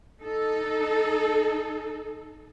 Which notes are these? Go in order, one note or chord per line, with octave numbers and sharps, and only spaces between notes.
D#4 A4